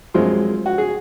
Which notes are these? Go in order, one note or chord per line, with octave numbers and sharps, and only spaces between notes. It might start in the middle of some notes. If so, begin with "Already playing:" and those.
F#2 F3 G#3 C4 F4
F#4
G#4